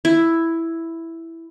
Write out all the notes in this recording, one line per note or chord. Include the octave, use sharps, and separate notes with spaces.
E4